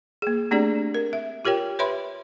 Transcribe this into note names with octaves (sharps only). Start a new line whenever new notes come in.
A#3 G#4
A3 C4 D4 G4 G#4 D5
A#4
E5
F4 G4 A#4 C#5 G5
B4 C#5 E5 B5 C6